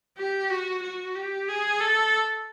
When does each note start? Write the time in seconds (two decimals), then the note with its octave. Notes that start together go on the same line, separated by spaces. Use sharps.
0.17 G4
0.50 F#4
0.82 F#4
1.15 G4
1.48 G#4
1.80 A4